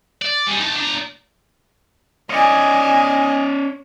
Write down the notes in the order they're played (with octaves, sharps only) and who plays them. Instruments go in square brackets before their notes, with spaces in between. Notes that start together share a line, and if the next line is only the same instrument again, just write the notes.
[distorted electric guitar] D5
G3 G#4
D#4 A5
D4 A#5
[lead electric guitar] C#4 D5 [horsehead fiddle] D#5 G#5